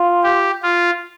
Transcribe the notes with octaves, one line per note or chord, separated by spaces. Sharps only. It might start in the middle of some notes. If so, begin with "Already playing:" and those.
Already playing: F4
G4
F4